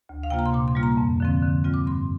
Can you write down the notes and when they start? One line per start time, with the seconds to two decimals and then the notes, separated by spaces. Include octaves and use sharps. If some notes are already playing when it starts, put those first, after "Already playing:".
0.09 D2
0.23 F5
0.30 C3 A#3 F4 G5
0.39 A#5
0.46 C6
0.53 A#2 D6
0.68 C6
0.75 G3 A#3 F4
0.83 A#5
0.97 F2
1.20 D3 F3 C4
1.43 D3
1.64 G3 C4 F4
1.74 D6
1.86 G2 C6